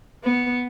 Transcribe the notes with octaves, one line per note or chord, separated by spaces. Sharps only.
B3